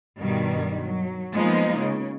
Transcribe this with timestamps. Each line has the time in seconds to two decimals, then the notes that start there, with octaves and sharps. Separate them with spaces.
0.20 G2 B2 D#3 G3
0.85 F#3
1.34 F3 G#3 A#3 B3 D#4 F4
1.78 C#3